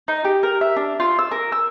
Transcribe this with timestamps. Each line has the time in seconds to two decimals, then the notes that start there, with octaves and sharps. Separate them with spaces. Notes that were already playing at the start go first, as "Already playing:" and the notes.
0.08 D#4
0.25 G4
0.43 A#4
0.61 E5
0.76 D4
1.00 F4
1.19 E6
1.31 A#4
1.52 E6